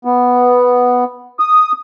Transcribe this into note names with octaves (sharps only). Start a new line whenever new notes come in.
B3
D#6